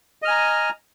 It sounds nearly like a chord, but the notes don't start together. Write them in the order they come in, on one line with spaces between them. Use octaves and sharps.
D#5 F6 G#5 A#5